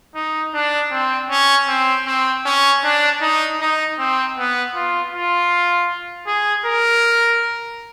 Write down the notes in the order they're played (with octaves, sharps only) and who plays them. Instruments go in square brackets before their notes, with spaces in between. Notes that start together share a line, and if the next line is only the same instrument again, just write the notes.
[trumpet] D#4
D4
C4
C#4
C4
C4
C#4
D4
D#4
D#4
C4
B3
F4
F4
G#4
A#4